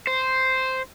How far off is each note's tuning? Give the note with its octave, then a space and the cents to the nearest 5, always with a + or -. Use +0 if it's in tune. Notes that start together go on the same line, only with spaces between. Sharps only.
C5 -5